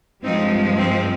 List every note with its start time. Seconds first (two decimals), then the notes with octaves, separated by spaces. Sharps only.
0.24 G2 F3 G#3 C4 D#4
0.79 C4